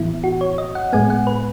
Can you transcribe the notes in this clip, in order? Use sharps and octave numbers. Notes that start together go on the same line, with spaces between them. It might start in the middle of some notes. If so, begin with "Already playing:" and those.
Already playing: A2 E3 B3 E4
F#4
C#5
D#5
F#5
A2 G#3 B3 G#5
F#5
B4